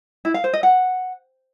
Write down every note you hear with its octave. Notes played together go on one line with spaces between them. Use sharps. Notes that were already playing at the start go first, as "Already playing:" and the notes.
E4
F5
C5
D#5
F#5